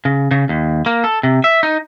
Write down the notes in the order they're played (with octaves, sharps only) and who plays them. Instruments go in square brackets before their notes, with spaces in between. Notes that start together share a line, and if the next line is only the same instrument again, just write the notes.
[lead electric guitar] C#3
C#3
D#2
A#3
A4
C3
E5
D#4